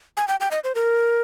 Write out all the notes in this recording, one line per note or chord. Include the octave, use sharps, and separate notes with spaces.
G#5
G5
G5
D#5
C5
A#4